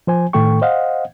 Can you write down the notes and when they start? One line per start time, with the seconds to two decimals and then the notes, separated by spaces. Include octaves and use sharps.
0.07 F3 C5 G#5
0.33 A2 D#3 A3 A4 G5 C#6
0.62 C5 D#5 F5 F#5